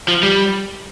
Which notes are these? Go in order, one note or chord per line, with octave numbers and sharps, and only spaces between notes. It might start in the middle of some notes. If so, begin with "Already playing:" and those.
F3
G3